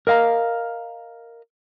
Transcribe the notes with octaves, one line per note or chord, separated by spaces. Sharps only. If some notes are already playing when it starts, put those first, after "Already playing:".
A#4 D#5 F5 A5 A#5